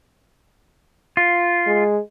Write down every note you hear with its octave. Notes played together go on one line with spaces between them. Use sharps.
F4
G#3